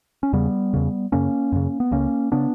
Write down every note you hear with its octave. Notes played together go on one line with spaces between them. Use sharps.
C#4
E2 C#3 G3 B3
E2 C#3
F#2 C#3 A#3 C#4
F#2 C#3
B3
C#2 C#3 A#3 C#4
C#3 B3 D4